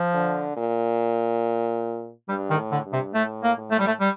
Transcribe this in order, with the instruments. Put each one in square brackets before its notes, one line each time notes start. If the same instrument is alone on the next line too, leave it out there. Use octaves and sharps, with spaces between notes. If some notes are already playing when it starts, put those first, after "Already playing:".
Already playing: [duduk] F3
[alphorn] D3
A#2
[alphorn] G2 [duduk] G3
[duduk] D#3
[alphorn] A2
[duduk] D3
[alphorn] G2
[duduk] C3
[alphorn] A2 [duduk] A3
[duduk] A#3
[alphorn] A2
[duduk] A3
G3
A3
G3